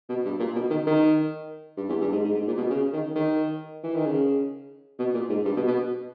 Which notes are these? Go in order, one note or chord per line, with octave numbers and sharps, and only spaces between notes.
B2
G2
A#2
B2
D#3
D#3
G2
E2
G2
G#2
G#2
G#2
A#2
B2
C#3
D#3
D#3
E3
D#3
C#3
B2
A#2
G#2
G2
B2
B2